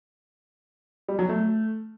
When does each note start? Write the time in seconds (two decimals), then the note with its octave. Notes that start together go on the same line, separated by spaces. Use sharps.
1.08 G3
1.19 F#3
1.29 A3